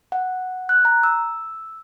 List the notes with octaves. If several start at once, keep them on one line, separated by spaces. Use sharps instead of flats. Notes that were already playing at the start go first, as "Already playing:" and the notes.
F#5
F#6
A#5
E6